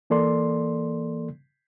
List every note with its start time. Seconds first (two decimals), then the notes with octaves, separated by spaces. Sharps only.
0.10 E3 A#3 A4 D5 C6